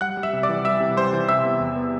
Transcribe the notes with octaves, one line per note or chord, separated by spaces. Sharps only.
G3 F#5 F#6
G3
E5 E6
C3
D5 D6
E3
G3 E5 E6
C3
G3 C5 C6
E3
C3 E5 E6
B3
E2
B3